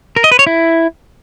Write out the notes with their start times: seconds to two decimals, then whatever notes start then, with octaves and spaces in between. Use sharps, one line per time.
0.16 A#4
0.24 D#5
0.31 B4
0.39 C#5
0.47 E4